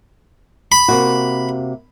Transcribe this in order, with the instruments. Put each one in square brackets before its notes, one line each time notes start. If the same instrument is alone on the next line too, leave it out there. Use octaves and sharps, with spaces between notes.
[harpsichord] B5
[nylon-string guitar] C3 A#3 F#4